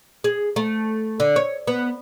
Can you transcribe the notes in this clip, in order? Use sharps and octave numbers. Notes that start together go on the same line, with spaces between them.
G#4
A3
D3
C#5
B3